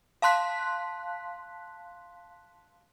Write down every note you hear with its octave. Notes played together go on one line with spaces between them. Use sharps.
F5 A5 C6 F#6 B6